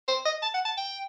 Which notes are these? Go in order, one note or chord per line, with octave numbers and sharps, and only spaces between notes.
C5
D#5
A5
F#5
A5
G5